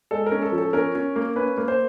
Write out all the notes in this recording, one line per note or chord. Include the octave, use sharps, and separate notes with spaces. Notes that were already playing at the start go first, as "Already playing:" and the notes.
G#3 A4
A#4
C#4
A4
F3
A4
C#4 A#4
C#4
A#3
C#4 B4
A#3
C5